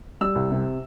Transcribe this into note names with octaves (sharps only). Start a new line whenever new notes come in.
G3 E6
C2
C3